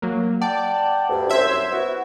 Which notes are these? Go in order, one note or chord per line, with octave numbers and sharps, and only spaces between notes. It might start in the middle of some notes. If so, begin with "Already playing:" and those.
F#3 A#3
D5 F#5 G5 A5
D2 G2
C2 F#2 C5 E5 G#6
B3 E4 F#4